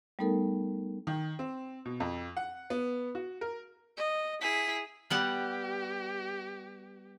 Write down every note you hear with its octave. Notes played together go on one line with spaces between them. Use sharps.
G3 A3 B3 D#4 A4 A#4
D#3
C4
B2
F2
F#5
B3
F#4
A#4
D#5
E4 G#4 B6
G3 B3 G4 F#5